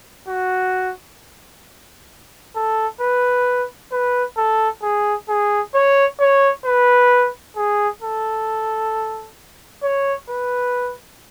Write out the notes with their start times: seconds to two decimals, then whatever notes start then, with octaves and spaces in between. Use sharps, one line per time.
0.28 F#4
2.55 A4
3.01 B4
3.92 B4
4.37 A4
4.83 G#4
5.29 G#4
5.74 C#5
6.20 C#5
6.65 B4
7.56 G#4
8.02 A4
9.83 C#5
10.29 B4